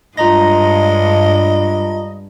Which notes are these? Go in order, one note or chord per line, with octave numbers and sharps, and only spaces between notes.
G2 G#3 F4 D#5 A#5 A#6